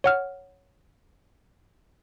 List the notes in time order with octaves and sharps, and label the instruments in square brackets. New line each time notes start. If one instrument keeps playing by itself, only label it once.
[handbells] C#5 F#5 F6